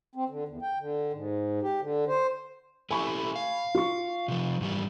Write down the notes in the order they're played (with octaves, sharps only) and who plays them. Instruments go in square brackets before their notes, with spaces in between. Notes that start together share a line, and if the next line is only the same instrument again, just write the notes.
[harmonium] C4
D3
E2
G5
D3
G#2
G4
D3
C5
[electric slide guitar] A3 E4 G4 [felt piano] G#5 B5 C#6
[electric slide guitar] F5
[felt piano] F4 C#6
[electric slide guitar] C3 F3
G#2 E3 G3